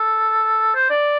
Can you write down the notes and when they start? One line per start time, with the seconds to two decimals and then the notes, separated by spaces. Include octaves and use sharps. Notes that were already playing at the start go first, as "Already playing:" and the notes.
Already playing: A4
0.75 C5
0.90 D5